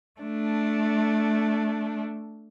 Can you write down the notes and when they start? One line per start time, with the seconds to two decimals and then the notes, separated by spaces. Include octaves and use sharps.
0.20 A3 D4